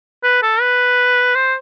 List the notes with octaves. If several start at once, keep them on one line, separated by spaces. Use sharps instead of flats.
B4
A4
B4
C5